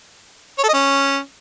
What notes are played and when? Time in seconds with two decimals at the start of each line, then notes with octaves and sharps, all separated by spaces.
0.58 C#5
0.63 A4
0.69 D#5
0.74 C#4